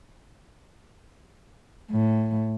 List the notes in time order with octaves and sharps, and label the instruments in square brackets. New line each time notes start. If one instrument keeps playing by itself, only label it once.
[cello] A2